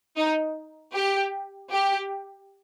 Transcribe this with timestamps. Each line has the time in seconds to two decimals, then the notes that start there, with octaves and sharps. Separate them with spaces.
0.17 D#4
0.95 G4
1.71 G4